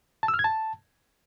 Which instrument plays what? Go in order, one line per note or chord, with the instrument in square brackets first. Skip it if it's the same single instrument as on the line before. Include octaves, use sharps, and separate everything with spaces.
[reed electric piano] A5
E6
F6
G#6
A5